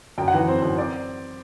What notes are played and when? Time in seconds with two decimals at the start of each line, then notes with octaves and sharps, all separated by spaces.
0.18 F#2 G5
0.28 F#5
0.33 E3
0.48 C4 C5
0.62 F#2
0.77 C4 D5